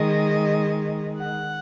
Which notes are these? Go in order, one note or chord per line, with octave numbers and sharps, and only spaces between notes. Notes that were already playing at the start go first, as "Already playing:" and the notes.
Already playing: D#3 G#3 D#5
F#5